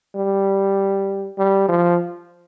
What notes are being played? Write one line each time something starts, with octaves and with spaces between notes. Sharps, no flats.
G3
G3
F3